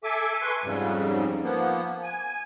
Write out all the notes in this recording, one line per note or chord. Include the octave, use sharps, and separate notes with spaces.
A4 E5 G#5 D6
B4 G#5 C6 C#6
F2 G#2 C#3 G3
F3 A#3 B3
G#5